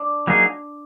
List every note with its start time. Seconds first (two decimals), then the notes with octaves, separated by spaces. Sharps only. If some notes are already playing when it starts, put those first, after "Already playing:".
Already playing: D4
0.27 F#3 A#3 D#4 G#4